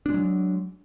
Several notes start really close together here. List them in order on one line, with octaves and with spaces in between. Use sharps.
D4 G#3 F#3